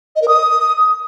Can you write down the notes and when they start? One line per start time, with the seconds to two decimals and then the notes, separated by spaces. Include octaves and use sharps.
0.16 D#5
0.22 A#4
0.28 D#6